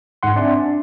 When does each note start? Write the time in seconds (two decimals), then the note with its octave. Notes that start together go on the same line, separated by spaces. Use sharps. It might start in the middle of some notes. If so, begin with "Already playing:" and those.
0.23 G1 G#2 F#5 C6
0.36 C4 D4 D5 E5 G#5 C6
0.57 D4